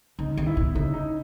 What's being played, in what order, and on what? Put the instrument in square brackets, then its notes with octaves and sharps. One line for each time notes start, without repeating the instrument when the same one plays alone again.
[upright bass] C#3 [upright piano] D#4
[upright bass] D#3
[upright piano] E4
[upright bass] B2
[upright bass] C#3 [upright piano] D#4
[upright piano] D#4